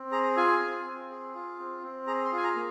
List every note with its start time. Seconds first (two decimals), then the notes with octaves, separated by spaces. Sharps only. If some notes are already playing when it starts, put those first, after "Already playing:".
Already playing: C4
0.12 G#4 A#5
0.37 F4 G#5
0.61 C4
0.85 C4
1.10 G#4
1.34 F4
1.59 C4
1.83 C4
2.07 G#4 A#5
2.25 C6
2.32 F4 G#5
2.44 A#5
2.56 A#3